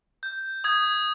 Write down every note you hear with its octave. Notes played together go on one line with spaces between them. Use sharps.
G6
D#6 G#6